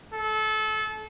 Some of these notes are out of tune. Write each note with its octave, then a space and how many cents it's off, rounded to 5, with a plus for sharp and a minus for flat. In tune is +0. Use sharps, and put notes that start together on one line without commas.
A4 -25